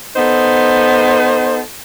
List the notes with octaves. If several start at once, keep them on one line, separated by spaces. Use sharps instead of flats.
B3 D#4 A4 C5